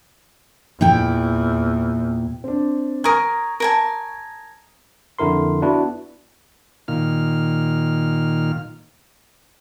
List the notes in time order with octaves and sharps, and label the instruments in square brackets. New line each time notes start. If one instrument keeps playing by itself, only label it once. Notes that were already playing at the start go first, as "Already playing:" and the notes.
[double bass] E2 [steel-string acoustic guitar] A#2 E4 G5
[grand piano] C4 D4
[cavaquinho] A#4 G#5 [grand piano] A#5 C#6 D#6
[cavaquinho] A#4 G#5 A5
[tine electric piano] F2 D3 E4 A#4 C6
B3 D4 E4 F#4 B4
[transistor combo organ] A#2 D#3 F6